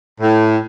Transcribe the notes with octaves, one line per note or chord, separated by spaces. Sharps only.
A2